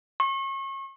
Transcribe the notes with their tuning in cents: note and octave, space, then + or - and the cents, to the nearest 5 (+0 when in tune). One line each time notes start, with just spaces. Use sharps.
C#6 -35